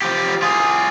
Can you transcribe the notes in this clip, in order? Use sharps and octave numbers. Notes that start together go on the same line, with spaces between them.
F3 G4
F4 G#4